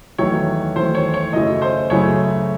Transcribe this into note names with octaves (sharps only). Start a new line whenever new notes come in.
E2 D#3 F#3 A3 C#5
E2 D#3 F#3 A3 C5
C#5
C#5
F#2 C#3 F#3 A3 D#5
C5
F#2 C#3 F#3 A3 C#5